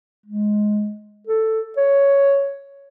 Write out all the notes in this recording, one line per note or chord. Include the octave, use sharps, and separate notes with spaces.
G#3
A4
C#5